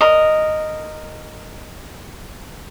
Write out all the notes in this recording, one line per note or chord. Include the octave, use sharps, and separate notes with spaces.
A#4 D#5